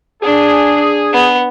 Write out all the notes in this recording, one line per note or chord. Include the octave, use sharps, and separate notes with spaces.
D4 G#4
B3